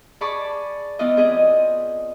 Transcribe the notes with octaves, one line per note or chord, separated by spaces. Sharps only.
G#4 D5 A5 B5 C#6 D6
E3 B3 E4 F4 D5 D#5
C4 G#4 B4 D#5